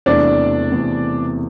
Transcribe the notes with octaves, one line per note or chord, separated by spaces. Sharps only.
E1 E2 C3 E3 A3 D4 D5
E1 E2 C3 E3 A3